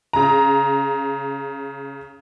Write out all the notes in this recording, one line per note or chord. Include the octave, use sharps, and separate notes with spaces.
C#3 A#5